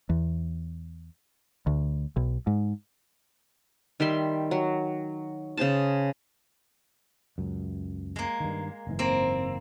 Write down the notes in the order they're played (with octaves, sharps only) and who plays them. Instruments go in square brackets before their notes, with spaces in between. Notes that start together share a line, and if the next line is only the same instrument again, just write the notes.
[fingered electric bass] E2
D2
B1
G#2
[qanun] D#3 G3 E5 C6
F#3
C#3 G#4 C5 A5
[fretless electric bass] C#2 F#2
[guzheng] G#3 A#3
[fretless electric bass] G2 D#3
F#1 G#2 E3
[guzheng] A#3 C4